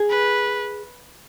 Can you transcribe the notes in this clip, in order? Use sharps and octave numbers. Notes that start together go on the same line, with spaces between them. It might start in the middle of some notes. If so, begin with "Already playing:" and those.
Already playing: G#4
B4